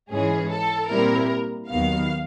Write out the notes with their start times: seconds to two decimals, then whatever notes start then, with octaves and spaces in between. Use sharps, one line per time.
0.11 G#2 E3 G#3 C#4 G#4
0.50 A4
0.90 A#2 G3 C4 E4 A#4
1.69 D#2 D#3 F#3 B3 F5